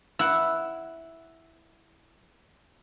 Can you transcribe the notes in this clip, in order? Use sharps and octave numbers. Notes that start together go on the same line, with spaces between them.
E4 F#5